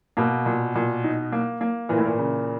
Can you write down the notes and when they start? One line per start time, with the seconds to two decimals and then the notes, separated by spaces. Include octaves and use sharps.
0.17 B2 A#3
0.46 A#2
0.75 A#2
1.04 D#4
1.32 A#3
1.61 A#3
1.89 A#2 E3
1.98 A2
2.05 A#2
2.18 C#3